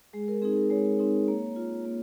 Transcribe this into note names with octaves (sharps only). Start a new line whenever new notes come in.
G#3 G#4
A#4
C4 D#4 G#4
G#4
A#4
G#3 C#5
C4 D#4
A#3 C#5
F4
A#3